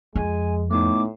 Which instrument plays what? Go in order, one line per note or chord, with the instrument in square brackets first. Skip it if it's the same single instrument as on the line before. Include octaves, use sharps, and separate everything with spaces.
[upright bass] F2 [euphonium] G#3 [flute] G#5
[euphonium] A2 [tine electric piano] A3 B3 D#4 [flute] D6